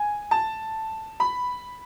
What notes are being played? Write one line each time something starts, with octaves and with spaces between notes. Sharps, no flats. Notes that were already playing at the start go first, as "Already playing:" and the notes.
Already playing: G#5
A5
B5